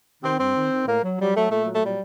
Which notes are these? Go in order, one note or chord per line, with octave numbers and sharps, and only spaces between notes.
D#3 C4
G2 C4
D#3
D#3
A2 A#3
F#3
F#3 G3
F#3 A3
A#2 A3
F#3
A3
A#2 G3